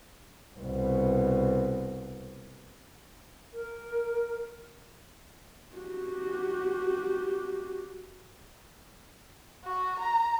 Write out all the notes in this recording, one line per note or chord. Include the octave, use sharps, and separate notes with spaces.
C2 B2
A#4
F#4 G4
F#4
A#5